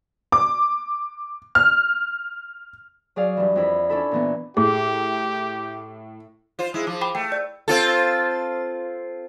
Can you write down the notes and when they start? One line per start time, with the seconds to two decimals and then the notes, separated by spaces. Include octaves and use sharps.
0.32 D6
1.55 F6
3.16 F#3 G#4 D5 F5
3.37 G2 E3
3.56 F2 E4 B5
3.89 C#4 D4 E4 A4 B5
4.11 A#2 E3 B3
4.57 A2 G4 G#4
6.59 F4 C5
6.74 G#3 E4
6.87 F3 D6
7.01 G5 B5 D6
7.15 A3 G5
7.32 D5
7.68 C4 F4 A4